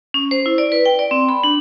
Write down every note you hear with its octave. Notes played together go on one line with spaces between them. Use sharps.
C#4
C5
E4
D5
B4
G5
D5
C4
B5
D4